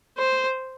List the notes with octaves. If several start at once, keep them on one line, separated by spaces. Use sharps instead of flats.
C5